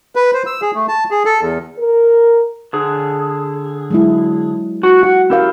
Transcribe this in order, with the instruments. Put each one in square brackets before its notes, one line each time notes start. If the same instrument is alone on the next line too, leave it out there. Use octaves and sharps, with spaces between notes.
[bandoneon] B4
C5
E6
G#4
A3
A5
G#4
A4
E2
[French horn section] A#4
[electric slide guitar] D3 G#4
[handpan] F#3 G#3 E4
[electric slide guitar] F#4
[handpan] F#4 [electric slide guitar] F#5
[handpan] C#4 A#4 F5 [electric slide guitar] E4 G4